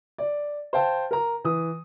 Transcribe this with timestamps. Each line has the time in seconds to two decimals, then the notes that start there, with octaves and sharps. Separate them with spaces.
0.18 D5
0.73 C5 F5 G5 A5
1.11 A#4 A#5
1.44 E3 D#6